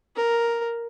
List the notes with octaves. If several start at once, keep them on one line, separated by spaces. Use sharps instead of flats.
A#4